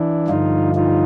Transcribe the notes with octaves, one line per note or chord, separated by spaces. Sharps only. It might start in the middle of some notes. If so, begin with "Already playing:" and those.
Already playing: E3 D4 E4
G2 D3 F3 D#4 F4
D#4 F4